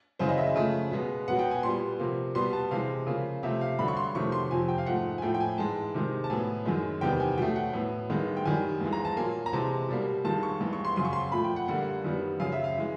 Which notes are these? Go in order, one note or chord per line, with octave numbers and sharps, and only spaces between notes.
F#2 C#3 E3 G#3 C5
D#5
E5
C#3 F3 A3
B2 G#3 B3
B2 F#3 B3 F#5
G5
G#5
A#2 G3 B3 C6
C3 F3 A#3
B2 G3 B3 C6
A5
C3 E3 G#3 F5
C#3 F3 A#3
C3 F3 A3 E5
F5
G2 D3 F#3 B5
C#6
C6
F2 C3 D#3 F#3 A3 C#6
C6
F2 C3 F3 G#5
G5
F5
G#2 F3 A3 F#5
G#5
A2 F3 A3 G5
G5
G#5
G#2 E3 G#3 A5
C3 D#3 G#3
A5
A2 F#3 B3 G#5
F#2 D#3 G#3
E2 C3 D#3 G3 B3 G5
G#5
B2 F#3 A3 G5
F#5
A2 F#3 B3
G2 D#3 G#3 B3
G5
F#2 D#3 G3 G#5
G2 E3 G#3
A#5
A5
A#2 F#3 A#3 G#5
A#5
C3 E3 G#3 A5
B2 G3 A#3
G2 D#3 G#3 A5
C#6
G2 E3 G#3
C#6
C6
F#2 C#3 F#3 C6
C#6
C6
A#2 F3 A3 B5
G5
F#5
G2 D3 G3 A#3 F#5
F#2 D#3 G3 B3
F#2 C#3 F#3 F5
E5
F5
E3 G#3